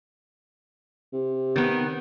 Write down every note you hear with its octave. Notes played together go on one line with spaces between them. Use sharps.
C3
D#3 B3